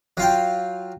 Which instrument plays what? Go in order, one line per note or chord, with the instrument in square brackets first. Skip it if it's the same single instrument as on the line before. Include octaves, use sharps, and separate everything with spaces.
[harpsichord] F#3 F4 G5